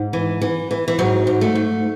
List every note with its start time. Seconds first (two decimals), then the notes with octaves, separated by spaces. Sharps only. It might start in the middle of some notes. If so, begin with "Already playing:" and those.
Already playing: G#2
0.13 E3
0.42 E3
0.71 E3
0.88 E3
0.99 G#2 F#3
1.27 G#2
1.41 A3
1.55 G#2